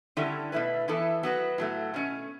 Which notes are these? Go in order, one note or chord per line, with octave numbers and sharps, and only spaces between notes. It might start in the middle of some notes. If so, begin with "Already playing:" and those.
D3 G3 C#4 E4 A4
B2 A3 E4 B4
E3 B3 E4 A4
F#3 B3 F#4 B4
A2 F#3 A3
B2 A3 C#4